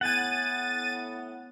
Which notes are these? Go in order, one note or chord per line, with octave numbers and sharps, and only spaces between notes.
A2 B3 F#5 G#5 A6 D#7